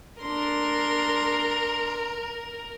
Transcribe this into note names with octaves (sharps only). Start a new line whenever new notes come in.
D4 A#4 C6